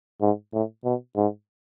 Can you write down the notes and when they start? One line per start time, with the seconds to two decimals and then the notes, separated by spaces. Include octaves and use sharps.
0.21 G#2
0.53 A2
0.85 B2
1.17 G#2